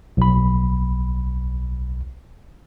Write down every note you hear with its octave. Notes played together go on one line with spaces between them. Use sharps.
B1 B5